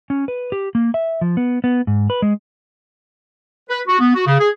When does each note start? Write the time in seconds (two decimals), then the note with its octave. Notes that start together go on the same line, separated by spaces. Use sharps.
0.10 C#4
0.28 B4
0.52 G4
0.75 A#3
0.94 E5
1.21 F3
1.37 B3
1.64 B3
1.87 G#2
2.10 B4
2.22 G#3
3.69 B4
3.88 F#4
4.00 B3
4.15 F#4
4.27 C#3
4.39 G#4